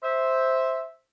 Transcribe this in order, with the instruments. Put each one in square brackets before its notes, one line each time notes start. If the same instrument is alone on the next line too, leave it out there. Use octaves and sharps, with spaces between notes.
[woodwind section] C5 E5